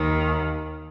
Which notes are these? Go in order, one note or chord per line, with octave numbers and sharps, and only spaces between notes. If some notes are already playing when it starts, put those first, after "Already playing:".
Already playing: D#2 D#3